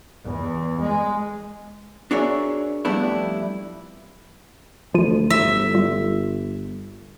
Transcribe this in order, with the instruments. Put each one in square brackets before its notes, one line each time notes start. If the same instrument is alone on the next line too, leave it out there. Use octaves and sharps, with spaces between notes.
[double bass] E2
G#3
[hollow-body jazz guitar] D4 F#4 G#4 A#4 C#5 E5
F2 G3 A3 B3 D4 E4
[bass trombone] D2 [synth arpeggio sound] F3 F4 D#7
[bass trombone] G1 [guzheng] E5
[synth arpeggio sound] G3 F4